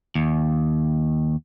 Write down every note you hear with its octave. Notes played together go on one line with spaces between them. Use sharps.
D#2